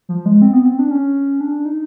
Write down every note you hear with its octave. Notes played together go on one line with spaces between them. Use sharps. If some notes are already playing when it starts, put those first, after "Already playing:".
F3
G#3
C4
B3
C4
D4
C#4
D4
D#4